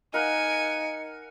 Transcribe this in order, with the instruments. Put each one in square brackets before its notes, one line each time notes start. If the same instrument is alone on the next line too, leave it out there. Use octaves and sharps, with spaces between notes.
[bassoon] D#4 [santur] A#4 F5 F#5 [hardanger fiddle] G#5 [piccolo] C#7